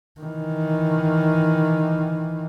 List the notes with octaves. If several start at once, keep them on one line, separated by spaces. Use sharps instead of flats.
D#3 E3